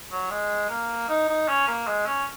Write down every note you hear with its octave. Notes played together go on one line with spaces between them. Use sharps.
F#3
G#3
A#3
D#4
D#4
C#4
A#3
G#3
C#4